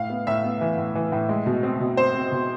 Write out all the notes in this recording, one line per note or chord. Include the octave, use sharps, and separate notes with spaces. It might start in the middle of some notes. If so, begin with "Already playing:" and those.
Already playing: A2 F5
B3
A2 E5
B3
E3
A2
E3
A2
G#3
B2
C4
B2
C4 C5
C4
B2